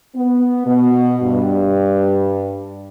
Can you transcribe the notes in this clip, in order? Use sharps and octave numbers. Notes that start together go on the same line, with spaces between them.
B3
B2
G2